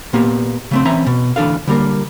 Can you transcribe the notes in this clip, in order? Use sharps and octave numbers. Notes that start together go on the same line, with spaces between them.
A#2 A#3 B3 G4
C#3 A3 C4
E3 C4 C#4 E5 A#5
B2
D2 E3 D4 A4 F5
D3 G3 A#3 A#4